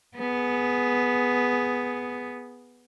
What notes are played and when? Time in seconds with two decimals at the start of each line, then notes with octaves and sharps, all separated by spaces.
0.16 B3 G#4